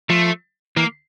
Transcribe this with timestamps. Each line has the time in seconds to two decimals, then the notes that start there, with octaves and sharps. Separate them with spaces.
0.10 F3 A3
0.77 E3 A#3